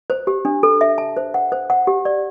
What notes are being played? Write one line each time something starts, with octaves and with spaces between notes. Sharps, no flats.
C5
G4
D4
A4
E5
A5
C5
F#5
C5
F#5
G4
D5